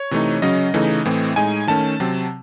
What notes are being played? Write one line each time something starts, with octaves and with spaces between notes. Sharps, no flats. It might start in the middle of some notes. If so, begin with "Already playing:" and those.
Already playing: C#5
C3 E3 A3 D#4
C#3 F#3 C#4 D#5
C#3 E3 A3 D#4
A2 E3 A3 C4
A2 G#3 D#4 G#5
D#3 A3 C#4 A5
C3 F#3 C4